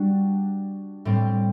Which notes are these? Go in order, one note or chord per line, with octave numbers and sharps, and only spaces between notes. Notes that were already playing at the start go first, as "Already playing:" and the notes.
Already playing: G3 D4 F#4
A2 G3 C4